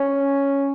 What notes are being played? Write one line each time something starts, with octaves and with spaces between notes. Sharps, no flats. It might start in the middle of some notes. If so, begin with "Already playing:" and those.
Already playing: C#4